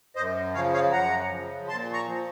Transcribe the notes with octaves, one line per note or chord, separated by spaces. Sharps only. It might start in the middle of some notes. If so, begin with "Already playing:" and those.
F#2 C5 D#5
C#3 F3 C#5 F5
C#5 F5
F#2 F#5 A#5
C#3 F3
A#2 A5 C6
A#5 C#6
F3